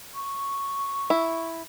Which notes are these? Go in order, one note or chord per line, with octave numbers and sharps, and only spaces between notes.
C#6
E4